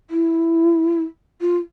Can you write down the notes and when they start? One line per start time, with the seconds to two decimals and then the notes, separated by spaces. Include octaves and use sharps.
0.10 E4
1.41 F4